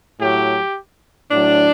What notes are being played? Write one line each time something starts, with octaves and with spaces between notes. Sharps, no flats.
A2 F#3 G4
A2 F#3 D4